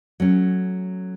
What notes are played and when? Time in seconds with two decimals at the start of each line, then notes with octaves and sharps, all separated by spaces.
0.20 F#3 A3 C#4